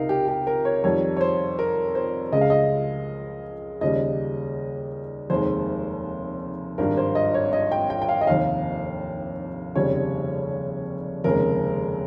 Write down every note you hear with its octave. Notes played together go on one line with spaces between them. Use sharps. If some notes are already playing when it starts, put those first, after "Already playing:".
Already playing: C#2 C3 D#4 A#4 F5
G4
G4
A#4
C#5
F2 D#3 G3 C#5
C#5
C5
A#4
C5
C#2 C#3 G#3 D#5
F5
D#5
D#2 C#3 G3 D#5
F1 D#2 D#3 G#3 C5
G#1 G2 G3 A#4
C5
D#5
C#5
D#5
G5
G5
G5
F5
D#5
F1 D#2 D#3 F5
F1 D#2 C#3 G3 C#5
F1 D#2 C#3 G#3 A#4